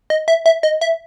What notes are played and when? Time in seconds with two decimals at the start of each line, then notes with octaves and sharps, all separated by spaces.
0.10 D#5
0.28 E5
0.46 E5
0.63 D#5
0.81 E5